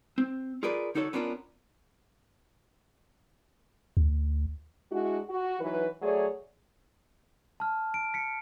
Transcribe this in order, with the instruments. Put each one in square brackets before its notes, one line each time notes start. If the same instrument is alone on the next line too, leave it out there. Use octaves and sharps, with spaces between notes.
[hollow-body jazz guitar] C4
F4 G#4 A#4 B4 D5
D3 D#4 F#4 A4 B4 C#5
B3 C#4 D4 F4 F#4 A#4
[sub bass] D2
[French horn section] G#3 D4 E4 F#4
F#4
E3 F#3 D#4 B4
F#3 A3 G#4 C#5 D5
[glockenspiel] A5 F6
D7
B6 C#7